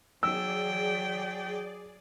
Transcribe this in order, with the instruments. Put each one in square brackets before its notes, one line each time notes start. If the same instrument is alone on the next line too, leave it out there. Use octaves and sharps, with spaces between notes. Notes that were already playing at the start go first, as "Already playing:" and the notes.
[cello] F#3 G5 [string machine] G#4 D5 [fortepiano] E6